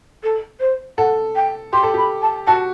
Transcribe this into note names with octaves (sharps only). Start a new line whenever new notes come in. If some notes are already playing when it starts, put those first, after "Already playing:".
A4
C5
A4 F#5
G5
G4 C6
A4
G4 B5
A5
F#4 A5